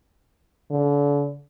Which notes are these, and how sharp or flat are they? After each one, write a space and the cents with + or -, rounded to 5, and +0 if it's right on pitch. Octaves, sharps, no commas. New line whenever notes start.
D3 -40